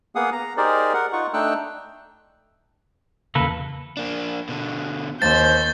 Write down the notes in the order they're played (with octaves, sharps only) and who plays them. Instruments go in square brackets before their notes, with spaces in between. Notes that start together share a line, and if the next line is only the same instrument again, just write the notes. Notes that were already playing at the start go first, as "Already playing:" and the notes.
[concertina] A#3 B3 G#4 F5 F#5 D#6
A#5
D#4 G4 G#4 A#4 C5 D5
A#4 F#5
D#4 F4 F#5 C#6
A3 D4 D#4 G5 E6 F#6
[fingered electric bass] E2 C#3 [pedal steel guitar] A#3 A4 B4
[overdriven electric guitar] A#3 D4
B2 D3
[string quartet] D#2 [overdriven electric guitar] C5 C6 [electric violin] G6 [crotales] A6